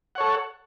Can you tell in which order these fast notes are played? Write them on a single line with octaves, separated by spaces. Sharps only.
F#5 C#5 A4